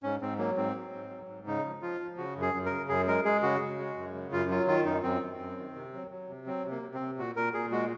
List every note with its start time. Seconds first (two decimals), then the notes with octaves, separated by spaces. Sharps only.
0.03 G#2 C#4
0.21 G#2 C4
0.38 F#3 A#3
0.56 G#2 C4
0.75 F#3
0.93 G#2
1.10 F#3
1.28 G#2
1.46 C#3 D#4
1.65 F3
1.82 F3 F4
2.00 F3
2.17 C#3 F#4
2.36 F#2
2.42 G#4
2.54 F#2
2.66 A#4
2.71 C#3
2.89 F#2 G#4
3.07 G#3 A#4
3.24 G#3 G#4
3.43 C#3 F#4
3.61 C#3
3.79 G#3
3.97 F#2
4.14 C#3
4.32 F#2 F4
4.50 F#3 F4
4.67 D#3 F4
4.85 F#2 D#4
5.03 F#2 C4
5.22 F#2
5.39 F#2
5.58 D#3
5.76 C3
5.94 F#3
6.11 F#3
6.28 C3
6.47 F#3 C4
6.64 C3
6.71 A#3
6.82 C3
6.94 C4
7.00 C3
7.18 A#2 F#4
7.36 A#2 A#4
7.54 A#2 G#4
7.71 G#3 F#4